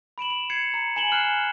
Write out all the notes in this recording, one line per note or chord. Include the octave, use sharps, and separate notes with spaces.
B5 D7 E7 F#7
F7
G#6 C7 C#7
A#5
G#5 E7 F#7 G7
F6 F#6 C7